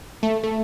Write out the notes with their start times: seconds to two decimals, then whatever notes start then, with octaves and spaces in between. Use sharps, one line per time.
0.23 A3
0.43 A3